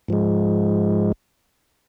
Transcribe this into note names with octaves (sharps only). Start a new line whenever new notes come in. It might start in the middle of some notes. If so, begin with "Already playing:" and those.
G#2 F3 G#3